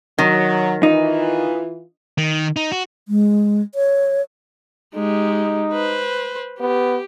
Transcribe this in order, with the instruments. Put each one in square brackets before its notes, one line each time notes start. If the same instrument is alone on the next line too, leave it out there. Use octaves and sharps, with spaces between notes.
[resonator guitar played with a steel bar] D#3 [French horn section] F#3
[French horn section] E3 F4 [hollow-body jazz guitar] D#4
[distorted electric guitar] D#3
D#4
F#4
[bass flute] G#3
C#5
[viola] G#3 G4 [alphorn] D#4
[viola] B4 C5
[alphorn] B3 [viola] G4